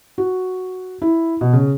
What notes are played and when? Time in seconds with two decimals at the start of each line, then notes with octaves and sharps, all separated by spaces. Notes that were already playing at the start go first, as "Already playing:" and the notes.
0.18 F#4
1.02 E4
1.41 B2
1.53 C#3